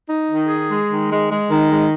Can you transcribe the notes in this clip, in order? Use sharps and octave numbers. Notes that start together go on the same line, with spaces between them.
D#4
D#3
G#4
G#3
D#3
G#3
G#3
D#3
G#3